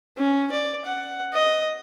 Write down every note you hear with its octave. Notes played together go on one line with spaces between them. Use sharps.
C#4
D5
F#5
D#5